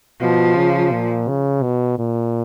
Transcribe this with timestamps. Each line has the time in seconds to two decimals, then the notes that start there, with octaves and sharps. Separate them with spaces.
0.21 B2 F3
0.56 C#3
0.92 A#2
1.28 C#3
1.63 B2
1.99 A#2